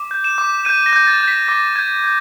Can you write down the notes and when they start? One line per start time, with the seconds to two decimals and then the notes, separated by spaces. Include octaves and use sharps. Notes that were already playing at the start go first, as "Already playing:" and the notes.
Already playing: D6
0.11 G6
0.24 E7
0.38 D6
0.65 G6 D#7
0.86 A#6
0.93 G6
1.07 A6
1.21 G6
1.28 B6
1.48 D6 A#6
1.76 G6 G#6
2.03 G6 G#6